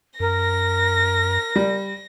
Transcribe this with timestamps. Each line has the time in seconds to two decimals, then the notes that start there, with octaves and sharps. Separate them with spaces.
0.20 F#2 A#4 A#6
1.56 G3